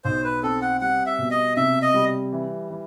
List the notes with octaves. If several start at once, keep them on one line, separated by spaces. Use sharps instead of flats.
B1 C5
B4
C4 A4
F#5
G3 F#5
E5
B2
D#5
C3 E5
D#5
G3
E3
E3